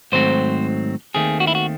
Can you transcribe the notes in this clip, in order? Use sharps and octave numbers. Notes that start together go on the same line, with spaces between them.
G#2 D#3 F#3 A3 C4 C5
D#2 D#3 A3 C4 G#4
F#4
E4
F#4